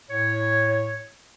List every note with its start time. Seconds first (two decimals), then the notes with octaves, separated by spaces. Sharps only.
0.10 A2 C#5